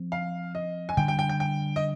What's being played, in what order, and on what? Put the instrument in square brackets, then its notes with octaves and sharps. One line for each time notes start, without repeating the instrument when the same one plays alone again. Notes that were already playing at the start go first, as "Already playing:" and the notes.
Already playing: [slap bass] F3 C4
[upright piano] F5
D#5
G#5
[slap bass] D3 G3 D4 [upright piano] G5
[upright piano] G5
G5
G5
G5
D#5